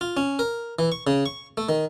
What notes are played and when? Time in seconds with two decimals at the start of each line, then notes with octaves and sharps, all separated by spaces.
0.01 F4
0.17 C#4
0.39 A#4
0.79 E3
0.92 C#6
1.07 C#3
1.26 C#6
1.57 A3
1.69 D#3